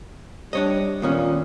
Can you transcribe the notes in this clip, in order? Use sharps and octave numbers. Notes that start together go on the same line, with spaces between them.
G3 D4 C#5 D#5
D#2 A#2 B3 C#4